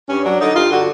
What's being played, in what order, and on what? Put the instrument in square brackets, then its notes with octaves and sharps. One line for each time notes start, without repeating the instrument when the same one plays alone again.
[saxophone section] G2 C#4
F#3 D4
D3 D#4
G2 F4
D3 F#4